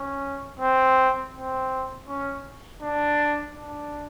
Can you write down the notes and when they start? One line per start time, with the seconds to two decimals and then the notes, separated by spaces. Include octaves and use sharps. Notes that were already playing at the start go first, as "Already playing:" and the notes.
Already playing: C#4
0.59 C4
1.34 C4
2.08 C#4
2.82 D4
3.55 D4